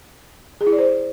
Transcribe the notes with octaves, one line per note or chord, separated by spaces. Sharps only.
G#4
E4
D5
C5